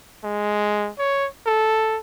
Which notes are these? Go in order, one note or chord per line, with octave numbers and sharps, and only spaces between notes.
G#3
C#5
A4